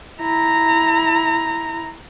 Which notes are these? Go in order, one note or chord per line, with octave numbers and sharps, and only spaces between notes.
E4 A#5